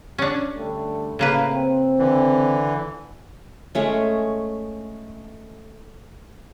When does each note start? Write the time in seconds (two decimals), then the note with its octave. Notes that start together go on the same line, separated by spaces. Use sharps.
0.18 C#4 D4
0.57 D3 G3 A3
1.19 A2 C#3 A#3 B4
1.48 C4
1.99 D3 E3
3.75 G#3 A3 C#4